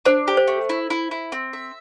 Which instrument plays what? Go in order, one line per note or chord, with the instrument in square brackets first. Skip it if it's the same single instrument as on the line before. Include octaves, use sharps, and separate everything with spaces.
[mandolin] D4 [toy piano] C5
[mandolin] G4
[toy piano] C5
[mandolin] A3
E4
E4
E4
C4
E5